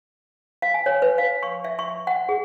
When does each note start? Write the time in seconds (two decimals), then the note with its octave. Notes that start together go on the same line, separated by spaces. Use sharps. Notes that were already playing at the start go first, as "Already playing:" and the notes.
0.62 F5
0.74 G#5
0.86 C#5
1.02 B4
1.18 F5
1.43 C#6
1.65 E5
1.79 C#6
2.07 F#5
2.29 G#4